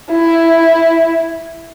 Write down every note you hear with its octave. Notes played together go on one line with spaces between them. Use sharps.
E4